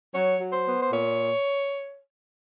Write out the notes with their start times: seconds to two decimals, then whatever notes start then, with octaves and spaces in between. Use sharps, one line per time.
0.13 F#3 C#5
0.40 F#3
0.52 C5
0.65 B3
0.81 C5
0.91 A#2 C#5